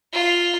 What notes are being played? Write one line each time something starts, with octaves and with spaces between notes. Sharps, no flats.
F4